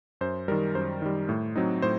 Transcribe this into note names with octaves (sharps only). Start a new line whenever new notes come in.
F#2 C5
D#3 G3 A#4
F#2 C5
D#3 G3
A2
F#3 C4 D#4
A2 C5